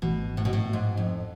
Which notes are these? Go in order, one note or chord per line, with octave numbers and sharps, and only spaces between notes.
G#1 G#2 B2 E3 A3
A2
B2
A2
G#2
F2